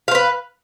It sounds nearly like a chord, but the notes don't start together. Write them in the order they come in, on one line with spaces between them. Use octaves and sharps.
F5 C5 B4